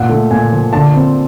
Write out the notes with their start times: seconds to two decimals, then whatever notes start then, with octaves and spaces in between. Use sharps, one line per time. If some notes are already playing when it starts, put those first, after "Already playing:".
Already playing: A#2 F#5
0.09 A3
0.31 A#2 G#5
0.52 F3
0.73 D3 A5
0.94 C4